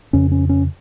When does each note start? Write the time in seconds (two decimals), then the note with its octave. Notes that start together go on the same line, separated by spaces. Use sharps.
0.13 F2 C#3 C#4
0.32 C#4
0.49 C#4